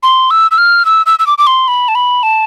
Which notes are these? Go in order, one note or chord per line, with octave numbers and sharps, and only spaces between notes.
C6
E6
E6
F6
E6
E6
E6
D6
D6
C6
B5
A5
B5
A5